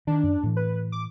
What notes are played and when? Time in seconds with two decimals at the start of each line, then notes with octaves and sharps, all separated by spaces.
0.07 D#3 D4
0.23 F#2
0.43 A2 E3
0.57 B4
0.92 D6